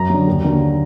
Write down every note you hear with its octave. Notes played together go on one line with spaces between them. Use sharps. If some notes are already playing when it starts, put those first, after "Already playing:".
Already playing: F#2 A#5
D3 F#3
D#2
D3 F#3 A#3